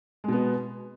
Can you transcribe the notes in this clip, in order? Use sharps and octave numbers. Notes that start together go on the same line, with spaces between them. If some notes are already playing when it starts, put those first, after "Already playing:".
B2 G#3 B3